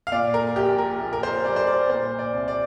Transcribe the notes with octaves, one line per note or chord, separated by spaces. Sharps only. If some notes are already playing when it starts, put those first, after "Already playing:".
F5
A#2 D5
A#4
A#1 G4
A#4
A#1
A#4
C5
G3 D5
C5
D5
A#2 C5
D5
C2
D5